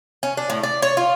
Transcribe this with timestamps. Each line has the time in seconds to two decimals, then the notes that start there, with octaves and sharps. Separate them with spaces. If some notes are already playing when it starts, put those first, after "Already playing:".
0.23 C#4
0.37 D4
0.50 A2
0.63 D5
0.82 C#5
0.97 F4